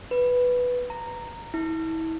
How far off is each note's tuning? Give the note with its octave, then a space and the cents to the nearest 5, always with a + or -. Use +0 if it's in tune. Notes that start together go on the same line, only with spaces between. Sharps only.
B4 +0
A#5 -10
E4 -35